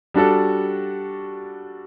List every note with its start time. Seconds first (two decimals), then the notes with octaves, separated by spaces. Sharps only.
0.14 G3 D4 F#4 A4